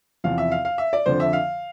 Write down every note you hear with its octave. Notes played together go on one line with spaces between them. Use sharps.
E2 C3 F3 F5
E5
F5
F5
E5
D5
F2 D3 F3 C5
E5
F5